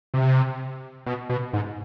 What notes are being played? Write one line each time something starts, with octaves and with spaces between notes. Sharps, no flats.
C3
B2
B2
G#2